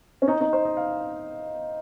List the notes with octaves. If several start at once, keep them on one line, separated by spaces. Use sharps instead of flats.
C#4
D#4
D#4
C5
D#5
F5